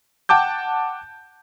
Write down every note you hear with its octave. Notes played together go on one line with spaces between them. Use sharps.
F#5 G5 A5 D6 G6